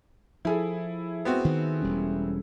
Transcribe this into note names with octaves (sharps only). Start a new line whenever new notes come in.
F3 E4 G#4 A4
B3 C4 F#4
D#3
E1 G3 C#4